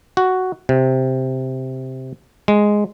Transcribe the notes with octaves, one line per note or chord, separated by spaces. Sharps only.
F#4
C3
G#3